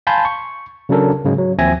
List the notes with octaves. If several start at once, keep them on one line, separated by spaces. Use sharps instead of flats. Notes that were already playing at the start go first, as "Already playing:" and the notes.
F5 G#5 A5 B5 C6 G6
C#6
C#3 F#3 C#4 D4 A4 A#4
G#2 C#3 F#3 G#3
F#3
D#2 F3 C4 E5 G#5 A#6